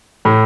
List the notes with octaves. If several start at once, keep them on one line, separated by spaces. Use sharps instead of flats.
A2